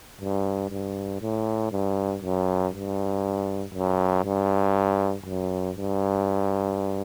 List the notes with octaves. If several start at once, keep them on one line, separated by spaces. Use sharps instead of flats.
G2
G2
A2
G2
F#2
G2
F#2
G2
F#2
G2